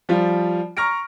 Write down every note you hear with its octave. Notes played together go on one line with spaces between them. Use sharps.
F3 G3 F4
A#5 C#6 F6 A#6 D7